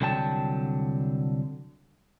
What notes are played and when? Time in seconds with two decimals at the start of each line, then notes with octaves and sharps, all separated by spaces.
0.01 C2 D3 F#3 G5 A5